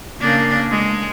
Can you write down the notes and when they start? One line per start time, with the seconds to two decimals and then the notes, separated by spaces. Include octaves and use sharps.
0.20 C#3 A#3 D4
0.71 G#3